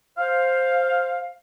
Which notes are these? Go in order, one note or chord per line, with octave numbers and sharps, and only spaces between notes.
C5 F5